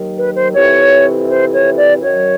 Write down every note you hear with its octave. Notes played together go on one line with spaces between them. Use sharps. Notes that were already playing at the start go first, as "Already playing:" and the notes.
Already playing: D#2 D#3 F#3
B4
C5
F2 C3 E3 C#5
C5
C#5
D5
F#2 D#3 F#3 C#5